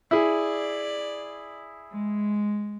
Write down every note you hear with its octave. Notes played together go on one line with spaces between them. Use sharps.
E4 G#4 D5
G#3